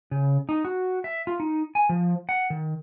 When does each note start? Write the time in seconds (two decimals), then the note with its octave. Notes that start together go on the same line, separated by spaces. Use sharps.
0.11 C#3
0.49 D#4
0.65 F#4
1.04 E5
1.27 F4
1.40 D#4
1.75 G#5
1.89 F3
2.29 F#5
2.50 D#3